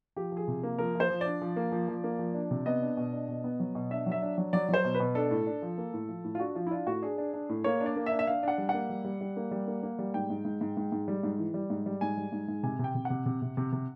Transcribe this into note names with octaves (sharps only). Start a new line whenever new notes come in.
F3 G4
F3 G#4
C3
A#3
F3 A#4
F3
C5
F3
D4 D5
F3
A#3
F3
F3
A#3
F3
D4
C3
B3 D#5
D4
B2
D4
B2
B3
F#3
B2
D4 E5
F#3
E5
D4
F#3
F#3 D5
F#3 C5
B2
B4
B2
D4 A4
A2
D4
F3
A#3
A2
F3
A2
F4
D4 F#4
F3 F4
E4
D4 F4
A2 F#4
D4 G#4
D4
D4
A2
A#3 C#5
D4
D5
A#3
E5
D4
E5
D4 F5
D4 F#5
G3
F#5
A#3
G3
G3
G3
A#3
G3
A#3
A#3
G3
G#2 G5
G#2
G#2
G#2
G#2
G#2
G3
G#2
E3
G3
G#2
G3
G#2 G#5
G3
G#2
G#2
C3 G#5
C3
G5
C3
C3 F#5
C3
C3
C3
C3